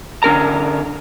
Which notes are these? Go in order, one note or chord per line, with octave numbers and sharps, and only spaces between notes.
D3 C#4 A#4 A#5